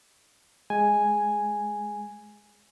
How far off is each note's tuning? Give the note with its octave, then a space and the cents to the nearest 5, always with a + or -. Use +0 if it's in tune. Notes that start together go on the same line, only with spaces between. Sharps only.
G#3 +0 G#5 +0